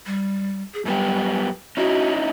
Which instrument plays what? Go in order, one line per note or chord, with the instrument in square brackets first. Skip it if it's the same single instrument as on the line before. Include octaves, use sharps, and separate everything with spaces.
[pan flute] G3
G#4
[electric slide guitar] F#2 B3 G4 [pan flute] G3
[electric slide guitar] C#4 D#4 E4 [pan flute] F#4